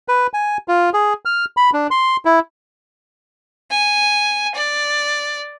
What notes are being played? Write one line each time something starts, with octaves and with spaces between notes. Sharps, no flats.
B4
G#5
F4
G#4
F6
B5
D4
C6
E4
G#5
D5